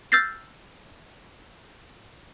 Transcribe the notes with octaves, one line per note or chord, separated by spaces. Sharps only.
E6 F6 G6 A6 A#6 C7